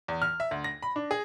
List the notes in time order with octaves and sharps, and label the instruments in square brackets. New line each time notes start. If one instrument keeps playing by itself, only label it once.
[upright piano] E2
F6
E5
D2
A#6
B5
D4
G#4